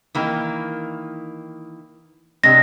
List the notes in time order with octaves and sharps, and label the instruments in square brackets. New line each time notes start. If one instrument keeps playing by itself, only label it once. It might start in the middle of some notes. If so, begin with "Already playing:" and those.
[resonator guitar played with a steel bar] D#3 E3 A#3
[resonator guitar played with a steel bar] C3 G#3 D4 [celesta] A#6